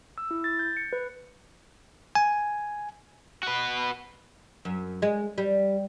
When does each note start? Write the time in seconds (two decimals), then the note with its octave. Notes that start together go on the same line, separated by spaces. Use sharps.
0.18 E6
0.31 E4
0.44 A6
0.59 G6
0.77 C#7
0.93 B4
2.15 G#5
3.43 F#4 B4
4.65 F#2
5.02 G#3
5.38 G3